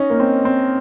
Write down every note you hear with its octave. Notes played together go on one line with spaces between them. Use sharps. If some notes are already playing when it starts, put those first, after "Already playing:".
Already playing: C#4 D#4
A#3
C4
C4